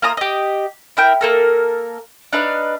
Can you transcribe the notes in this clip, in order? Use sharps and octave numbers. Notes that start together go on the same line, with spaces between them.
A#3 F4 A#5 D#6
G4 D#5
E4 A#4 G5
A#3 A4 A#4
D4 D#4 B4 F5